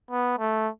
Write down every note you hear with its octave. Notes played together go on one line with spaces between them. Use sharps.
B3
A3